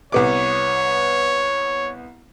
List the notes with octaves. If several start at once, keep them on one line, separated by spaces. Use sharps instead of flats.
C2 B3 C#5 D6